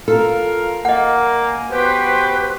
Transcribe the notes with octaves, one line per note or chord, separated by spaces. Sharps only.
F4 A4 A#4 F5
A#3 D#5 F#5
G#5
B3 F#4 G4 B4 C5